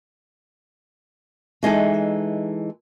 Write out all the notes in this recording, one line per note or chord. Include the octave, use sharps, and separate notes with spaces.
E3 G#3 D#4 A4